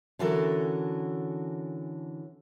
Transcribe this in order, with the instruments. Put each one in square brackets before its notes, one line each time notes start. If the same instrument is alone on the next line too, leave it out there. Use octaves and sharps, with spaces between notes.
[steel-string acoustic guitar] D3 E3 C#4 F#4 A4 A#4